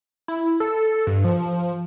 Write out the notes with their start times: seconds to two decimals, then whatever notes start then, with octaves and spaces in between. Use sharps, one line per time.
0.28 E4
0.60 A4
1.07 G2
1.24 F3